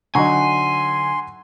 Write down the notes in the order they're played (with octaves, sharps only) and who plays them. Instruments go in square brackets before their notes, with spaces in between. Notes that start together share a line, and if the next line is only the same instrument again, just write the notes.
[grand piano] D3 F#3 D#4 [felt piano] F#5 A#5 C#6 [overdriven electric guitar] G#5 [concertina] C6